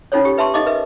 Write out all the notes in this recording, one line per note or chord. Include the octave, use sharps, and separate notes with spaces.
C#4 D#4 F4 A4 C5 C#5
G4
B4 E5 A5 C6 C#6
D#4 A4 D#5 F5 D6
A#4 B4 E5